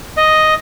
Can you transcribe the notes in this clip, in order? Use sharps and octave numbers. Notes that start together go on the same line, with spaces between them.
D#5